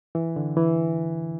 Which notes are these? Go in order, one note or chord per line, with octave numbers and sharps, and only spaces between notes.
E3
D3
E3